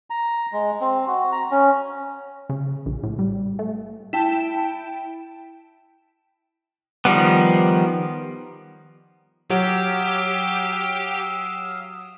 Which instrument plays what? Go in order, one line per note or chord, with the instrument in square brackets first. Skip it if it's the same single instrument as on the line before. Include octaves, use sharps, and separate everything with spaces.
[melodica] A#5
G#3
C4
F#4
A#5
C#4
[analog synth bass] C#3
A#1
A2
G3
A3
[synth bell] E4 G5 A5
[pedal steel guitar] D#3 F3 G3 B3
[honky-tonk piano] F#3 [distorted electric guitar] G4 [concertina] F5 D#6 E6